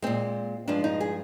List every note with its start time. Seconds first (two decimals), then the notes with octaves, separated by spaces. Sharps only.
0.02 A#2 G#3 C4
0.68 G2 F3 G#3 D4
0.84 D#4
1.01 G#4